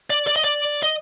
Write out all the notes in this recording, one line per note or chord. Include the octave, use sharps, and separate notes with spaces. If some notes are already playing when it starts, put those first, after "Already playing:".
D5
D5
D#5
D5
D#5